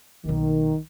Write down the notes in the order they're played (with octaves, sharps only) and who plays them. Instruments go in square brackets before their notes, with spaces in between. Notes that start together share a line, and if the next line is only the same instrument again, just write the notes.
[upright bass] B1 A#3 [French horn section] D#3